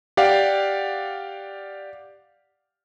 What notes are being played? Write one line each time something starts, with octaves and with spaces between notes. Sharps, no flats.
G4 D5 F5 F#5